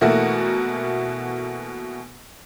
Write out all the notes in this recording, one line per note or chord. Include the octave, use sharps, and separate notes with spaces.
B2 E3 A3 A#3 F#4 A#4